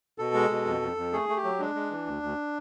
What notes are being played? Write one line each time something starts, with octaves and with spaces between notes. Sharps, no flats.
B2 A4
G#3
B2
F2
F2
F2
A3 G#4
A3
G4
F#3
G#3 D4
G#3
E3
D2
D2